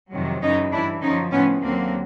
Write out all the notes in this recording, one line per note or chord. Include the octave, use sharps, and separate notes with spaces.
F2 C3 D#3 F#3
F#2 C#3 E3 C#4 D#4
G2 E3 D4 E4
F#2 D3 F3 C#4 D#4
A2 F3 B3 C#4
D#2 D3 F#3 A#3 C4